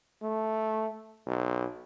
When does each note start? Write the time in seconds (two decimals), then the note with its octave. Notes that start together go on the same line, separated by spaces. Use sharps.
0.22 A3
1.27 B1